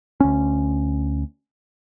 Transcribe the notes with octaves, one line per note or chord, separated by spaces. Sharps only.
D2 C#4